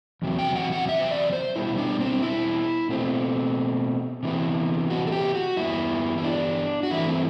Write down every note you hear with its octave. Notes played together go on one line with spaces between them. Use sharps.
E2 C3 F#3
G5
F#5
F#5
E5
C5
D5
C5
B2 G3 B3 E4
D4
C4
E4
B2 A3 C4
C3 E3 B3
F#4
A4
G4
F#4
G2 E3 B3 E4
E4
D4
F#4
G2 E3 A3 C4 E4
C4